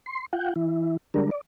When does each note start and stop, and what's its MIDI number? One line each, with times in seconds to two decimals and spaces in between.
0.06 0.26 84
0.33 0.53 65
0.33 0.53 78
0.33 0.53 79
0.56 0.97 52
0.56 0.97 64
1.14 1.30 50
1.14 1.30 55
1.14 1.30 56
1.14 1.30 62
1.14 1.30 70
1.31 1.41 74